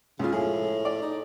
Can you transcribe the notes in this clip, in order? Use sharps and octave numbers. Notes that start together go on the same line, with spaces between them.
C#2 C#3 F4
A2 F3 G#4
D5
D#4